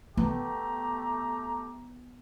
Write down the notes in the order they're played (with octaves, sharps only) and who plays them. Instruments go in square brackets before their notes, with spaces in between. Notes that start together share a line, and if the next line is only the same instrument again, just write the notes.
[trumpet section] A3 G4 A#5 [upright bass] B3